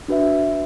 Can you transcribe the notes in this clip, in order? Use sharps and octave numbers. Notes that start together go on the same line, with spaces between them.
D4 F#4 B4 E5